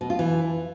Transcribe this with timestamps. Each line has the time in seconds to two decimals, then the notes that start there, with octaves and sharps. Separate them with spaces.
0.01 B2
0.10 F4
0.19 E3